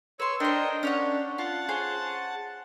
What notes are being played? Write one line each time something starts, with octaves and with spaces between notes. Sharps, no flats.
B4 C#5 C6 E6
D4 A#4 C5 D#5 G5
C#4 D4 C#5 F#5
F4 F#5 A5
G#4 C5 C#5